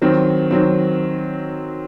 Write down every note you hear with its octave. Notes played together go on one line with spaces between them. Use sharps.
D#3 F#3 C4
D#3 F#3 C4